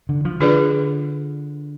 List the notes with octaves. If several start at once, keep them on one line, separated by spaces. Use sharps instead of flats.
D3
F3
D3 D4 F4 G#4 B4 D5